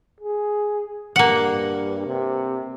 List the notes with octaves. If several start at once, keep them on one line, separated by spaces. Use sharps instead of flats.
G#4
G2 A#3 F#5
C3